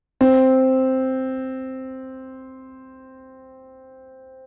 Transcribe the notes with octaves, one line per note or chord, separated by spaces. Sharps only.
C4